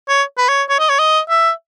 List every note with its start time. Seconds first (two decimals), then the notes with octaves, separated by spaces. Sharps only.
0.09 C#5
0.38 B4
0.49 C#5
0.69 C#5
0.79 D#5
0.89 C#5
0.99 D#5
1.30 E5